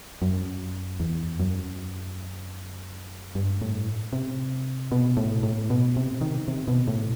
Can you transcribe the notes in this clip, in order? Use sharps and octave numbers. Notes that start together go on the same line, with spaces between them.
F#2
E2
F#2
G2
A2
C3
B2
A2
A2
B2
C3
D#3
C3
B2
A2